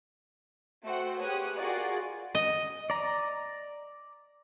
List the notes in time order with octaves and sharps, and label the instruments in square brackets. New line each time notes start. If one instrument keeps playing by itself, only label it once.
[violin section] A3 F#4 C5 F#5 G5
G4 G#4 B4 C#5 D#6 F#6
F4 F#4 G#4 A#4 D5 F#5
[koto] D#5
[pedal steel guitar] D5 A#5